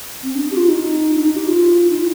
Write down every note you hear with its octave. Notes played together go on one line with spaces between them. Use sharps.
C4
D4
G4
F4
D#4
D4
D#4
G4
F4
D#4
F4